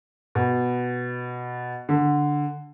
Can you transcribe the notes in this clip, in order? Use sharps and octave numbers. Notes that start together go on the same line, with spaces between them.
B2
D3